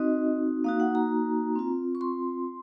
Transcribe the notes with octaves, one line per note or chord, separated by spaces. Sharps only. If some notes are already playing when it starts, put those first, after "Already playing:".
Already playing: C4 D#4 F#4 D#5
A#3 D#4 F#4 F5
F#5
A#5
C4 F4
C#6
C6